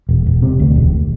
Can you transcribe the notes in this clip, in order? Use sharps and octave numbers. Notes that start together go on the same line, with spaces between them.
E1
E1
C3
D2
E1